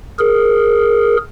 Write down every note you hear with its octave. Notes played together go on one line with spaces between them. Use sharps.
G#4 A#4